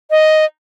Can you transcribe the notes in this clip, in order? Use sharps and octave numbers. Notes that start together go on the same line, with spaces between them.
D#5